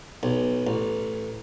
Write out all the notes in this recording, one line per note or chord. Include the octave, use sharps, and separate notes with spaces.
B1
A1